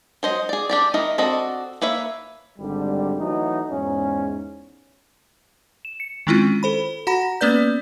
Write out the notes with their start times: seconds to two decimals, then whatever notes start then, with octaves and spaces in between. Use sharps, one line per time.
0.23 F#3 C5 D#5
0.49 G#4 D5
0.69 D4 G4 D5
0.94 D#3 E4 A#4 D#5
1.18 C4 D4 F#4 A4 D#5
1.82 A#3 B4 C#5 E5
2.59 G#1 D3 G3
3.19 E3 F#3 A3 D#4
3.70 E2 G#2 C#4
5.85 E7
6.00 C#7
6.27 D#3 G#3 C4 C#4 E4 F4
6.63 A4 C5 B5
7.07 F#4 F#5 A#5 B5 A#6
7.41 A#3 B3 C#4 B4 D5 G6